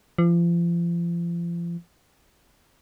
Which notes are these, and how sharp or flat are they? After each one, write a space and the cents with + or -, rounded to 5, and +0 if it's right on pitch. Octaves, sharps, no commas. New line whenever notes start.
F3 -35